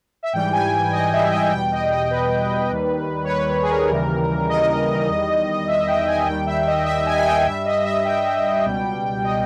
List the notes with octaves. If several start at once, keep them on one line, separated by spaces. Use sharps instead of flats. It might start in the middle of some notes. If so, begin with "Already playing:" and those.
E5
G#2 E3 G3 G5
G#5
D#5
E5
G5
E2 B2 G3 G5
D#5
D#5
B4
D#2 D#3 G3
C#5
B4
G#4
A#4
D#2 C#3 E3 G3
D#5
E2 D#3 G3
E5
G5
G#5
D#2 D#3 G3 G5
E5
D#5
E5
G#5
G#5
G5
G2 G3 E5
D#5
E5
G5
C#2 B2 G3
D#5